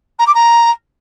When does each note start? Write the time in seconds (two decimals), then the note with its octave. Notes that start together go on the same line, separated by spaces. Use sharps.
0.19 A#5
0.26 D6
0.34 A#5